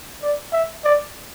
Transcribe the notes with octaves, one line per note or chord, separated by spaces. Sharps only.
D5
E5
D5